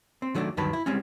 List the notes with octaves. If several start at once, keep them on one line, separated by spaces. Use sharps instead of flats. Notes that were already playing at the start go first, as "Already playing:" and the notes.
C4
D#3 F#3 A3 B3 D4
D2 G2 D#3 F#3 B4 A5
E4
G3 G#3 C4 C#4